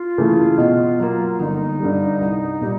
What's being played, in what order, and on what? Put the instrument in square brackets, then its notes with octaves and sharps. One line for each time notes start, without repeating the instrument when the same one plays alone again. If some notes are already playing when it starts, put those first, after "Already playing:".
Already playing: [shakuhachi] F4
[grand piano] C#3 E3 A3
B2
F#3 A#3
[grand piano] G1 [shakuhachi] D#4
[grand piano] G2 D3 G3
C2
A#2 G3